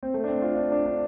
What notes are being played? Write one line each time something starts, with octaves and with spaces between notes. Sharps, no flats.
C4
A3
D4
C4
F4
D4
D4
D4